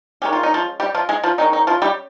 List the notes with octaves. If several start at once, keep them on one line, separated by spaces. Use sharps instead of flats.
D#3 G#3 C#4 G4
F4
D#4
F3 F4
G3 G4
F3 F4
G#3 G#4
F3 F4
D#3 G#3 C#4 D#4
D#4
F3 F4
G3 G4